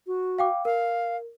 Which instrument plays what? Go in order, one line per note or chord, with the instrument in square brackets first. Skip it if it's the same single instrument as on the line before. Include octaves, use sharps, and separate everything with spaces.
[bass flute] F#4
[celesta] F5 G5 D6
[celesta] A#4 [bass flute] F5